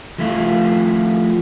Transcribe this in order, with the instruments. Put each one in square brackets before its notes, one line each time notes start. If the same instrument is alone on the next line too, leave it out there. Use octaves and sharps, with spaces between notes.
[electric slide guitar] F3 A3 E4 F4